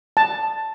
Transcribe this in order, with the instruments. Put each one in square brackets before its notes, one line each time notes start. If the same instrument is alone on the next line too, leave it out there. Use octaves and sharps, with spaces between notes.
[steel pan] A5